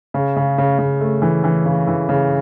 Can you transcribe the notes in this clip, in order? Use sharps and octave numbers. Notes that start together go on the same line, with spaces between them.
C#3
C#3
C#3
C#3
A3
E3
E3
C#3
E3
C#3